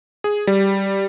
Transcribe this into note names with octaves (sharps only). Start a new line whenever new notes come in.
G#4
G3